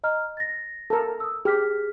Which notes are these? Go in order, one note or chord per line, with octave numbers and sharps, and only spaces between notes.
D#5 A#5 F6
A6 A#6
A4 A#4
D#6 E6
G4 G#4 F6 B6